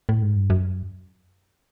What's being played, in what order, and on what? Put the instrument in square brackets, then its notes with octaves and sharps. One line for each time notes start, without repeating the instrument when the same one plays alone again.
[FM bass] A2
G#2
G2
F#2